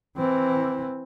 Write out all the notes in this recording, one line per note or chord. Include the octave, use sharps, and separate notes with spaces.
E3 C4